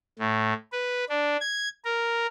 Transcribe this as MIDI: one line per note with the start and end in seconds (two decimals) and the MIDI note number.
0.19 0.53 45
0.72 1.05 71
1.09 1.37 62
1.41 1.69 92
1.85 2.27 70